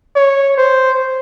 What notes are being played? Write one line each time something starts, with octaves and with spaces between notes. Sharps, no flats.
C#5
C5